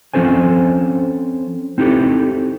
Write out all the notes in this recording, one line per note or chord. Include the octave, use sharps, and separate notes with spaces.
F3 C4 C#4 A4 C5 G#5
C4 D#4 E4 G4 A4